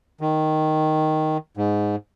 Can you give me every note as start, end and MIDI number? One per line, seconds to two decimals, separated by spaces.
0.21 1.37 51
1.57 1.96 44